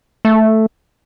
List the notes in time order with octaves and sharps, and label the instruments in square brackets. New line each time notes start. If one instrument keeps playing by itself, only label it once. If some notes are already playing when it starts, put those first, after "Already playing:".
[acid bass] A3